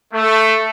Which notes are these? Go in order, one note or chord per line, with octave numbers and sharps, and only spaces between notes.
A3